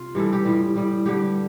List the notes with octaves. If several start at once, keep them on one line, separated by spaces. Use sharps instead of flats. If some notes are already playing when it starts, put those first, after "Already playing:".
Already playing: C3 F4
G2 E3 G3 A4
G4
A2 E3 G3 F4
A2 G3
G2 D3 G3 G4